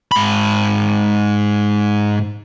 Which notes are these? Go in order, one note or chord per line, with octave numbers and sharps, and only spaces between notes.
G#2 B5